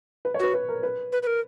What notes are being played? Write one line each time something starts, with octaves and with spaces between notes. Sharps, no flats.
B4
C#5
F#4 B4
B4
A#4
B4
B4
B4
A#4